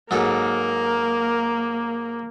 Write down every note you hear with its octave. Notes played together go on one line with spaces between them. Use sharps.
G#2 F#3 A#3 A4 A#4